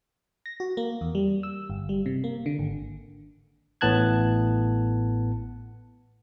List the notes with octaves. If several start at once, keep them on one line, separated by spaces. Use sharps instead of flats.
A#6
F#4
A#3
E2
G3
E6
G1
G3
C3
A#3
D3
G#1
A1 A2 B3 A5 F#6 G#6